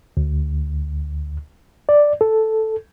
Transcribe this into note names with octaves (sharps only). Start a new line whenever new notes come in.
D2
D5
A4